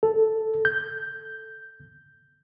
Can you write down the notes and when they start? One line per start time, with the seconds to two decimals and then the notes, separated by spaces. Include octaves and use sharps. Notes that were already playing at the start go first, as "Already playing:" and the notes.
0.03 A4
0.65 G6